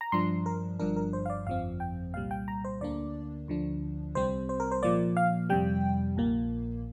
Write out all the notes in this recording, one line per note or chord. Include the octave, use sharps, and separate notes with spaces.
A#5
G2 F3 D4 C6
A#4
G1 G2 F3 D4 A#4
A#4
C5
F5
D5
G1 F2 F3 C4 F5
G5
C2 A#2 G3 F5
G5
A#5
C5
D2 D3 A#3 D4 D5
D2 D3 F3 D4
C2 C3 G3 C4 C5
C5
A#4
C5
A#2 F3 A#3 D5
F5
F2 C3 G3 G5
A#1 A#2 A#3